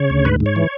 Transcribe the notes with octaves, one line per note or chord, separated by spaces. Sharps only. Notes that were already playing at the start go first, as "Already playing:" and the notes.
Already playing: C#3 C#5
D2
G#2 B4
G#2
C#5
E3